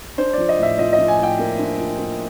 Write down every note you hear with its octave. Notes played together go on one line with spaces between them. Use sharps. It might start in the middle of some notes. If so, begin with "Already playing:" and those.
D4 C5
F3 D5
D#5
A2 E5
F3 D#5
D#5
F3
G#5
A2 G5
A#3
D4
F3
A#3